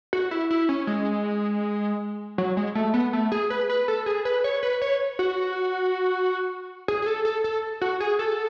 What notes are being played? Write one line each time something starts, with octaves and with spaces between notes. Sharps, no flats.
F#4
E4
E4
C#4
G#3
F#3
G#3
A3
B3
A3
G#4
B4
B4
A4
G#4
B4
C#5
B4
C#5
F#4
G#4
G#4
A4
A4
A4
F#4
G#4
A4